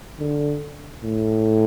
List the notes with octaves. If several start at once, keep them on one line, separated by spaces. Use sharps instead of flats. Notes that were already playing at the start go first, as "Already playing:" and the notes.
D3
A2